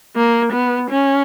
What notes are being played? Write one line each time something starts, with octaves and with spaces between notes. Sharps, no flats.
A#3
B3
C#4